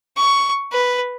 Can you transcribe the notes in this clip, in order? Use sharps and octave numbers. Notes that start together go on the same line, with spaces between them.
C#6
B4